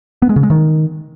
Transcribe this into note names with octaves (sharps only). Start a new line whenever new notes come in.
B3
G#3
C#3
G#3
D#3